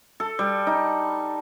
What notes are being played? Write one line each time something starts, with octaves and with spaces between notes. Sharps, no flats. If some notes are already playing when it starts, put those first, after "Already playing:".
A4
G3
D#4